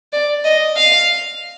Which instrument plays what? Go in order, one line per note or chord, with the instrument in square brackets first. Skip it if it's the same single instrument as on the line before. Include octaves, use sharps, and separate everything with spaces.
[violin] D5
D#5
F5